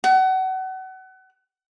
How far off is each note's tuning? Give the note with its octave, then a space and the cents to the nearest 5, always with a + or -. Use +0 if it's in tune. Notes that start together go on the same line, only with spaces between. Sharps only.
F#5 +30